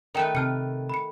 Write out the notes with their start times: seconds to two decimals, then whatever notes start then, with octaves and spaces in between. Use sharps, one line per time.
0.15 D#3 A3 A#4 B4 G5 E7
0.35 C3 A5 F6 C#7
0.89 B5 C#7